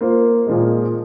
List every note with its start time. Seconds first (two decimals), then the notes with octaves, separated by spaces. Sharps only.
0.01 A#3 F4 C5
0.47 A#2 F3 G#3